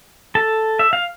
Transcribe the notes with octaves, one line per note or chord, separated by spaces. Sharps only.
A4 A5
E5
F5